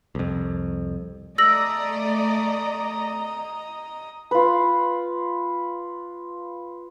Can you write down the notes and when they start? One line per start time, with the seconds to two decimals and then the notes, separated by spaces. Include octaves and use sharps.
0.15 C2 F2
1.38 A3 D5 D#5 A#5 E6 A#6 F#7
4.31 F4 B4